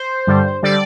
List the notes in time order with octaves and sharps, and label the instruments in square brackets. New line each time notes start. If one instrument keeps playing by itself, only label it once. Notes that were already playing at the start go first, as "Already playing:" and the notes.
Already playing: [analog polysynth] C5
G2 D3 G3
D3 G3 D5